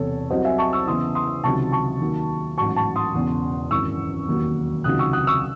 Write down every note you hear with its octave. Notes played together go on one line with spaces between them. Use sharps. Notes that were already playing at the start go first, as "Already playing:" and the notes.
Already playing: E1 E2 C3 A4 C#5
C2 C3 F#3 C5 D#5
E5 G#5
A5 C#6
C#6 E6
E2 C#3 E3 C6 D#6
C6 D#6
C#2 C3 D#3 F#3 A5 C#6
A5 C#6
D#2 D#3 F#3
A1 G#2 F#3 A5 C#6
A5 C#6
C6 D#6
E1 E2 C#3
G#1 F#2 E3 C#6 E6
E1 D#2 D#3 F#3
C#2 C3 D#3 F#3 D#6 F#6
C#6 E6
D#6 F#6
C#6 E6